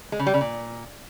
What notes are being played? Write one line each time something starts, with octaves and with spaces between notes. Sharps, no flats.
G#3
C#3
G3
C#3
A#2